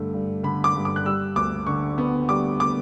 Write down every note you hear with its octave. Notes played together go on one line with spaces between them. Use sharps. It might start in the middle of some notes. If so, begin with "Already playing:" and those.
Already playing: G2 D3 A3
G2
D3 B5
D6
G2
D6
F#6
G3 E6
D2 D6
D3 C#6
B3
G3 D6
D6